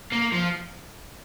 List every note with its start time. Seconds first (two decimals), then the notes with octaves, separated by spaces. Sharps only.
0.12 A#3
0.32 F3